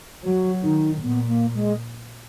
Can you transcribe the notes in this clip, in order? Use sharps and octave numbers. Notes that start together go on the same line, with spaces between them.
F#3 F#4
D#3 D#4
A#2 B3
A#3
G#3